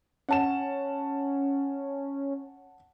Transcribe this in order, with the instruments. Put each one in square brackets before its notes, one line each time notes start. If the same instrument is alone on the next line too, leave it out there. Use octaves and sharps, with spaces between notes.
[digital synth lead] C#4 [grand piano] F#5 A5 E7